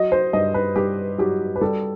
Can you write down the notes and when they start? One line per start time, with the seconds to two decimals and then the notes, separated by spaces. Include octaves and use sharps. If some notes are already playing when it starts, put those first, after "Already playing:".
Already playing: F#3 D#5
0.12 C5
0.33 G2 D#5
0.54 B4
0.76 G2 G4
1.18 F#3 G4
1.56 B4
1.61 G3 A4